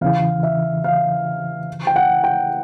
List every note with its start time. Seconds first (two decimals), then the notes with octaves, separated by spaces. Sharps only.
0.01 E2 C#3 E3 F5
0.43 E5
0.84 F5
1.87 G5
1.96 F#5
2.24 G5